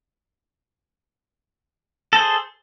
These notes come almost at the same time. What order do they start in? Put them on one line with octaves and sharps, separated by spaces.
A4 C5 G#4